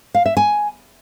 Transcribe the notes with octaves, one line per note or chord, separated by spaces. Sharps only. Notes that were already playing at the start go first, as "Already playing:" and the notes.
F5
E5
G#5